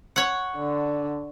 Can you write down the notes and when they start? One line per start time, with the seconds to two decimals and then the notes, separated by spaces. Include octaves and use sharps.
0.16 C#5 F#5
0.57 D3